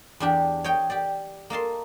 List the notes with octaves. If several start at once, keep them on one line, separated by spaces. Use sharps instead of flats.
E2 D4 G4
C#5 D#5 G5
G4 D5
A#3 D#5 A5 C6